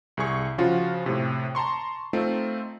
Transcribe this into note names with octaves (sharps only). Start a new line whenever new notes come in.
C2 G#4 C#6
C#3 F3 F4 F#4
A2 C3
A5 A#5 C6 C#6
A3 C4 D#4 F4